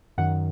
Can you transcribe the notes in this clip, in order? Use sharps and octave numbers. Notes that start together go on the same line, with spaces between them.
F#2 D#3 F#5